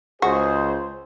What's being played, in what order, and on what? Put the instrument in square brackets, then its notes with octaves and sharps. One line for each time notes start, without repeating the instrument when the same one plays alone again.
[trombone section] C#2 G#4 C5 [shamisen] F#4